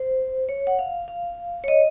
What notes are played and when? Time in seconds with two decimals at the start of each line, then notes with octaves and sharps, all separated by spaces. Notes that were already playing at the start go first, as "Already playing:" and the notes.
Already playing: C5
0.49 C#5
0.67 F#5
0.79 F5
1.08 F5
1.64 C#5
1.68 D#5